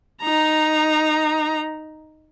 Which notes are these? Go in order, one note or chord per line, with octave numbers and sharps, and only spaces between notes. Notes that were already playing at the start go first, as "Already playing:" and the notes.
D#4 A#5